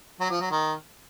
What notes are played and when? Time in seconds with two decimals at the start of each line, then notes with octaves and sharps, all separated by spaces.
0.20 F#3
0.30 F3
0.41 F#3
0.51 D#3